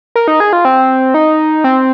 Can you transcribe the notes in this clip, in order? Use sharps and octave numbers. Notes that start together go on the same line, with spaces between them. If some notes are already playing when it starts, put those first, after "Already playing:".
A#4
D#4
G#4
F4
C4
D#4
C4